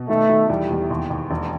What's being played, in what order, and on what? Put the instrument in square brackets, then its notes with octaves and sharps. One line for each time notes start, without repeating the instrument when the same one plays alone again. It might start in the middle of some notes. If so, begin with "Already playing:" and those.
Already playing: [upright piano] B2
[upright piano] D#3 [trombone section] A3
[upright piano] D#3
[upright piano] E2 [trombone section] G3
[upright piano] E2
D#2
D#2
E1